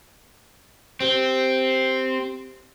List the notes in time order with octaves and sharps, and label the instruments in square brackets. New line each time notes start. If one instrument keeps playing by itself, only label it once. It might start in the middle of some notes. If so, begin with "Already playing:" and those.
[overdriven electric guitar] C4 [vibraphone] G4 C5